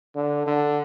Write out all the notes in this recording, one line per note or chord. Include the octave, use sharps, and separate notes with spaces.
D3
D3